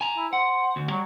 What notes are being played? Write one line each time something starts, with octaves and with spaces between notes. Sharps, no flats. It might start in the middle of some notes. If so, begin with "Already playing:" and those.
G#5 A#5
E4
C5 F#5
D2
F#3 G3